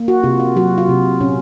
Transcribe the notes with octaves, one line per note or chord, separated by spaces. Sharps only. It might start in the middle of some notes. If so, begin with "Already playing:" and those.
Already playing: A#3
F#4
C3 F4
F4
F#3 F#4
F4
C3
A#2 C#4